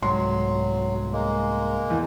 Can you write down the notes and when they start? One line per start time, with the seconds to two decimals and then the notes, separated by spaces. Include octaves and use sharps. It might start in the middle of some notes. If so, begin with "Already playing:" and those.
0.03 C2 G#2 F#3 C6
1.13 G#3 A#3
1.90 E2